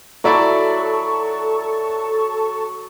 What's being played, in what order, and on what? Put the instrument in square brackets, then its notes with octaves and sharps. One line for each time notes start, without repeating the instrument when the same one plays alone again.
[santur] F#3 B5 [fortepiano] E4 D5 E5 [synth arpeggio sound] A4 A5 C#6